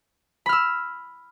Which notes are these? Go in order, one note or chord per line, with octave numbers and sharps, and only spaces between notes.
B5 E6 F6